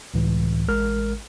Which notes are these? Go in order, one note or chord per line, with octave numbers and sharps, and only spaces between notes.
C#2 A2 E3
A1 G#3 A#4 F6